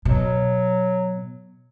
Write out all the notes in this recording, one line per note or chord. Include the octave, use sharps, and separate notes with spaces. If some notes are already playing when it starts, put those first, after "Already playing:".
B2 F#3